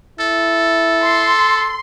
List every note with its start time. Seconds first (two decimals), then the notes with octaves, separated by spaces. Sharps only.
0.20 E4 A4
1.04 C6